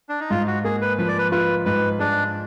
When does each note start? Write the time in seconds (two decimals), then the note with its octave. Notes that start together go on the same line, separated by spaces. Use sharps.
0.09 D4
0.20 D#4
0.30 G#2 F4
0.47 F#4
0.64 A#3 G#4
0.81 B4
0.98 F3 B4
1.08 D5
1.18 B4
1.32 F4 B4
1.66 G#2 B4
1.99 G#3 D4